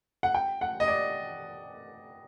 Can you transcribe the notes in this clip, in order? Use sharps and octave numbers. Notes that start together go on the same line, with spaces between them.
F#5
G5
F#5
D#5
D5